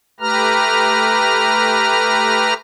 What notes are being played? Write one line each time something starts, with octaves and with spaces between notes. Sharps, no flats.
A3 G4 B4 A#5 F6